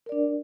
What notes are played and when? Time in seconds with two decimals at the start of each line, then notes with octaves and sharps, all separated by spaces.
0.06 A#4
0.09 D5
0.12 D4